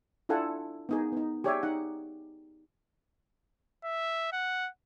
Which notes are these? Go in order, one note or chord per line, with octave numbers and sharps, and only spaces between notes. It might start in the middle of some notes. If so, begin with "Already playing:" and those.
D4 E4 F4 A4 F#5 G#5
B3 D#4 G#4
B3 D#4
G4 G#4 C#5 D5 E5 G#5
D#4 F#5
E5
F#5